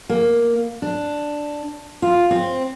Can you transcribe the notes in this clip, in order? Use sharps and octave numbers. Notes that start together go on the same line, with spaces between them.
A#3
D4
F4
C4